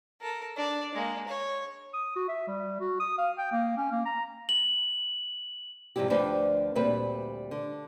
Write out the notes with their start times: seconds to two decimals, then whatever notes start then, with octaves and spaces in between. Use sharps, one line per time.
0.21 A4 A#4
0.57 D4 D5
0.95 G#3 A#3
1.28 C#5
1.94 D#6
2.16 F#4
2.29 E5
2.48 G3
2.80 F#4
3.00 D#6
3.18 F5
3.38 G5
3.52 A#3
3.77 C#4
3.92 A#3
4.06 A#5
4.49 F#7
5.96 G#2 C3 F3 G3 E4 G4
6.10 D2 F3 D4 B4 C5 G5
6.75 D2 A#2 G3 C4 B4 E5
7.51 D3